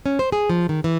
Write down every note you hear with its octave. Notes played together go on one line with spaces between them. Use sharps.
C#4
C5
G#4
F3
D#3
E3